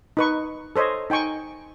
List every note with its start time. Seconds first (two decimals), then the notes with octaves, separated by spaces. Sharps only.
0.17 D#4 B4 C#6
0.76 A4 C5 C#5 D#5
1.10 D#4 G5 G#5 C#6